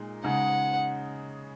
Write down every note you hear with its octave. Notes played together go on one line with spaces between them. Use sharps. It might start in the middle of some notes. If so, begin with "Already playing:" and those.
Already playing: A#2 G#3 D#4
C#3 G#3 D#4 F#5